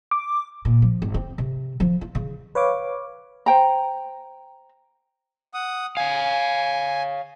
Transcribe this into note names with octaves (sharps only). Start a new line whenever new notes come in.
D6
A#2
F3
G#1
C4
C3
F3
F4
C#3
B4 C#5 F5 D6
C5 G5 A#5
F#5 D#6
C#5 F5 G#5